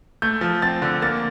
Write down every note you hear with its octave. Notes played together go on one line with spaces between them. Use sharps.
A3 G6
F3
C4 A6
D3
A#3 A6